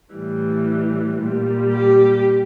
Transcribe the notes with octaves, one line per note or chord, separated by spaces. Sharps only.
A2 E3 G3
A#2 G3
G4